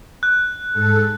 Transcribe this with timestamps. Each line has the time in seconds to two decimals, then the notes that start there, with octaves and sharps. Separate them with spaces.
0.23 F#6
0.73 G#2 A4